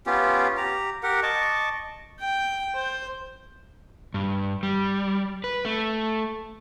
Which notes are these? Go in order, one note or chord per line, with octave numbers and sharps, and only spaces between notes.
B3 C#4 F4 G4
G4 A#5
G4 A#4 F#5
D#5 A5 C#6 D6
G5
C5
G2
G3
B4
A3